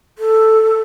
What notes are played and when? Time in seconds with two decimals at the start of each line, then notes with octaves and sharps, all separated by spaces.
0.18 A4